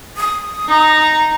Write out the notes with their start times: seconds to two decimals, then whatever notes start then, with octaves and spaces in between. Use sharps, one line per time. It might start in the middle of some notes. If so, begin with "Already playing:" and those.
0.17 D#6
0.68 D#4 A#5